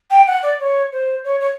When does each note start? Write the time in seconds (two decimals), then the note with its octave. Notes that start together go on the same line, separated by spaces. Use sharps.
0.11 G5
0.27 F#5
0.43 D5
0.60 C#5
0.93 C5
1.24 C#5
1.40 C#5